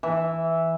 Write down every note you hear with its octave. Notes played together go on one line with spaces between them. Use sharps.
E3